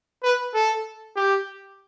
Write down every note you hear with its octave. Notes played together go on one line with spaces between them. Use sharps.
B4
A4
G4